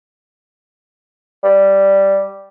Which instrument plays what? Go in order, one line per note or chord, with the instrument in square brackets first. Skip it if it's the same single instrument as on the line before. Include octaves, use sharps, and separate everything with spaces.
[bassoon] G3